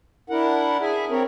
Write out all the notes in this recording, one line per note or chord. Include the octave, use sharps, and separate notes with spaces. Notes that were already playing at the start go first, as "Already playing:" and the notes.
D4 E4 A#4 F#5
G#4 E5 G#5
C4 A#4 C#5